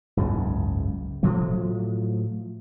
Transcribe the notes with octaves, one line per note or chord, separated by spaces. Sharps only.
F#1 C#2 G#2
A2 F3 F#3 A3